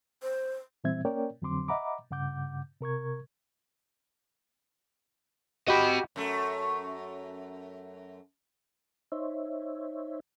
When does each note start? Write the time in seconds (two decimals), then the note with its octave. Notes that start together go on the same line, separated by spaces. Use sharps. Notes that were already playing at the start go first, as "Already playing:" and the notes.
0.23 C5
0.84 A#2 E3 G3 C4 E5 G#6
1.05 A#3 C#4 A#4 C#5 D5 G5
1.42 F2 D3 F#3 C4 C6 D6
1.68 D#5 E5 F#5 A#5 B5 D6
2.11 G2 C#3 F#5 D6 G6
2.81 C3 A#4 C#6 G#6
5.68 F#4 G4 D#5 B5
6.16 F#2 A3
9.12 D#4 C5 C#5 E5